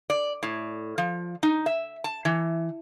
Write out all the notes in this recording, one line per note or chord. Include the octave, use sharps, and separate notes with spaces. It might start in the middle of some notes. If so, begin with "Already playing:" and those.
D5
A2
F3
D#4
E5
A5
E3